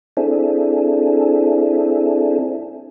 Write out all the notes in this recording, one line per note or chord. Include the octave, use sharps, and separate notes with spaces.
C4 D4 E4 G#4 A4